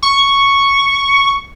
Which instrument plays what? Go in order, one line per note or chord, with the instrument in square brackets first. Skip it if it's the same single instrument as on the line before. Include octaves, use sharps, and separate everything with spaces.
[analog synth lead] C#6